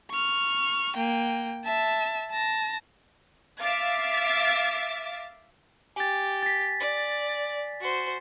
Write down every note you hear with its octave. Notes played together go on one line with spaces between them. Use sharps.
C#6 F6
A#3 G5
E5 A5
A5 A#6
E5 F5 D6 A6
G4 G#5 A6
A6 B6
D5
F#4 C5